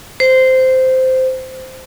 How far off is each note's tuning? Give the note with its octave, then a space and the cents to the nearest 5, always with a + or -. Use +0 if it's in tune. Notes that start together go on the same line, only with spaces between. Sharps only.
C5 -10